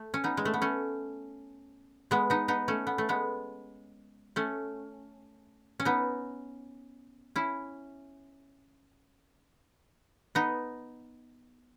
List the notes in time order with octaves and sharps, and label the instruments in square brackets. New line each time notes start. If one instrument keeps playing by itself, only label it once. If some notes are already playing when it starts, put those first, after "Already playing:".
Already playing: [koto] A3
C#4
B3 D#4
G#3
A3
B3
A3 C#4
G#3 B3
B3 D#4
B3 D#4
A3 C#4
B3
A3
G#3 B3
A3 C#4
C#4
B3 D#4
C#4 E4
B3 D#4